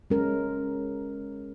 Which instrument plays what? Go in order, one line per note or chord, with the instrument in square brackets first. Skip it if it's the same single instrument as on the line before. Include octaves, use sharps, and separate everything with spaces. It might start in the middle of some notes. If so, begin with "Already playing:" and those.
[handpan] G#3 C#4 A#4